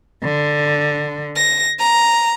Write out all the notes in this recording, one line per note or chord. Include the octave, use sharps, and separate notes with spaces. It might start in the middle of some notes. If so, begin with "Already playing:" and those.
D3
A#6
A#5